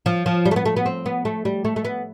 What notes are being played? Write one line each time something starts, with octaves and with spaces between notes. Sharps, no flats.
F3
F3
G3
A3
B3
A3
B3
C4
B3
A3
G3
A3
A3
B3